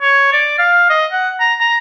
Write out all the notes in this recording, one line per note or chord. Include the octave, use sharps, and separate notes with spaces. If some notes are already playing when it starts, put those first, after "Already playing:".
C#5
D5
F5
D#5
F#5
A#5
A#5